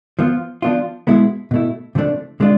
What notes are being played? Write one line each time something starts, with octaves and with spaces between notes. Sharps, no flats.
F3 B3 F4
F3 B3 D4 F4
B2 G#3 B3 E4
B2 A3 E4
C3 F3 A3 D4
C3 G#3 D4 F4